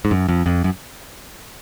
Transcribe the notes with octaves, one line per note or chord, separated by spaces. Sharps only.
G#2
F#2
F2
F2
F#2